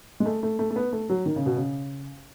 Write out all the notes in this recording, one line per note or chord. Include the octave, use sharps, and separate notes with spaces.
G#3
A3
A3
A3
A3
B3
A3
F#3
D#3
C#3
B2
C#3